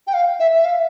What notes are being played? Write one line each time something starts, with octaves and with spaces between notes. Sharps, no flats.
G5
F5
E5
E5
F5